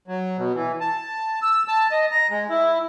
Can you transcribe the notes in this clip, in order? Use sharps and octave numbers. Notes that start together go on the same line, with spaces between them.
F#3
B2
E3
A5
E6
A5
D#5
A#5
G#3
E4